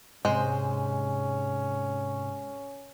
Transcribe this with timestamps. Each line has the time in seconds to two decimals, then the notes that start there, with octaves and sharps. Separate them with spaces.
0.25 G#2 C3 G#3 C#4 C5